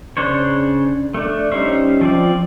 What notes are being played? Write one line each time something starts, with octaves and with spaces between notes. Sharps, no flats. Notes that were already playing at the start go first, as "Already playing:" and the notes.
C#3 D4 C5 C#5
A3 D4
G3 C#4 D#4 C5 E5
F3 C4 D5